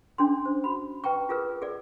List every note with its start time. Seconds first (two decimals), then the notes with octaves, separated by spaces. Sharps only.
0.18 C#4 D4 G#4 C6
0.46 C5
0.64 F#4 B5
1.04 B4 G5 A#5 C#6
1.29 F4 G#4 A#4 B4
1.62 G#4 A#4 D5